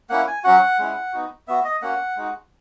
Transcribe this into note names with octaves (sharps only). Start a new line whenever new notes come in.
A#3 C#4 E4 F#5
G#5
F#3 C#4 F#4 F#5
G#3 C#4 E4
B3 D#4 F#4
B3 F#4 E5
D#5
A#3 C#4 F#4 F#5
G#3 D#4 F#4